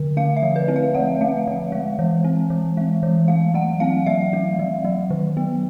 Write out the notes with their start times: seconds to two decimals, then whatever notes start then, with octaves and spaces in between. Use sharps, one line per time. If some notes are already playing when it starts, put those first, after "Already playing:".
Already playing: D3
0.17 A3 F5
0.37 E5
0.43 F3
0.56 B4
0.68 C4
0.76 F5
0.94 F3 F#5
1.21 A3 F5
1.47 F3
1.72 G#3
1.99 E3
2.24 C4
2.50 E3
2.77 G#3
3.03 E3
3.28 A3 F5
3.54 F#3 F#5
3.80 C4 F5
4.06 F#3 E5
4.33 A3
4.59 F#3
4.84 F#3
5.10 D#3
5.37 B3